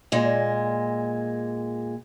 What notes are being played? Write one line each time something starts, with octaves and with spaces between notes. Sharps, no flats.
A#2 G#3